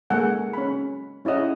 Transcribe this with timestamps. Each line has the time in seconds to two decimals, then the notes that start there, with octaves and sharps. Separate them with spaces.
0.10 G#3 A#3 A4 F#5 G#5
0.53 C#4 B5
1.25 C#4 E4 C#5 D#5 F#5